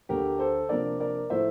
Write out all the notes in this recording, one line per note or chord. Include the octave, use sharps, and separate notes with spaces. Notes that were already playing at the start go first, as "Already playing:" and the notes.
D2 D3 A3 G4 A#4
A4 C5
C3 F3 A#3 D4 A#4 D5
A#4 D5
A2 F3 A3 E4 C5 E5